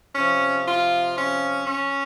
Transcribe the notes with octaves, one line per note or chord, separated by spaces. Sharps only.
C3 F3 C#4
F4
C#4
C#4